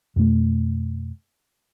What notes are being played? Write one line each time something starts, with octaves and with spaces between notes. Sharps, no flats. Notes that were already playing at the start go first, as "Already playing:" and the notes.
F2 B2 A3